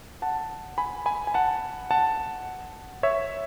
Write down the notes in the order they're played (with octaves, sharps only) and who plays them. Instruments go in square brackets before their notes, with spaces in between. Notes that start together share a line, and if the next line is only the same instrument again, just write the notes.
[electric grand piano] F#5 A5
G#5 B5
G#5 B5
G#5
F#5 A5
F#5 A5
C#5 E5